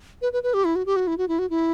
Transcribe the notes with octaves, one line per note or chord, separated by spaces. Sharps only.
B4
B4
B4
G4
E4
F#4
G4
F#4
E4
F#4
E4
F#4
E4